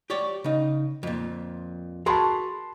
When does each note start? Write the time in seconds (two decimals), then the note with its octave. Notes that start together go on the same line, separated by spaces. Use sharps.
0.10 G4 C#5 D5
0.44 C#3 D#4
1.03 F2 A#2
2.06 F#4 G#4 A#4 A5 B5 C6